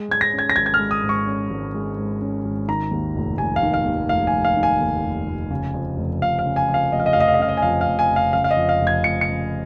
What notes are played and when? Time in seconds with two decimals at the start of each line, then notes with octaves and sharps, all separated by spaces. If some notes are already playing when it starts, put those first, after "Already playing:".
Already playing: G#3
0.08 G#2 G#6
0.21 A#6
0.33 C#4
0.39 G#6
0.50 A#6
0.56 G#1 G#6
0.66 G#6
0.74 F6
0.79 G#3
0.91 D#6
1.03 G#2
1.09 C#6
1.27 C#4
1.50 G#1
1.74 G#3
1.98 G#2
2.21 C#4
2.45 G#1
2.68 D#3 A#5
2.91 D#2
3.16 F1
3.38 F1 G#5
3.56 F5
3.62 D#3
3.74 F5
3.85 D#2
4.09 F1 F5
4.27 G#5
4.32 F1
4.45 F5
4.57 D#3
4.63 G#5
4.81 D#2
5.04 F1
5.27 F1
5.50 C#3
5.74 F2
5.97 F1
6.21 F1 F5
6.39 F5
6.46 C#3
6.56 G#5
6.68 F2
6.74 F5
6.92 F1 D#5
7.00 F5
7.06 D#5
7.13 F5
7.16 F1 D#5
7.28 F5
7.34 D#5
7.39 C#3 F5
7.49 D#5
7.57 G#5
7.62 F2 F5
7.81 F5
7.87 F1
7.99 G#5
8.10 F1
8.16 F5
8.33 C#3 F5
8.44 F5
8.51 D#5
8.57 F2
8.69 F5
8.81 F1
8.87 G#6
9.04 F1 C#7
9.21 C#7
9.28 C#3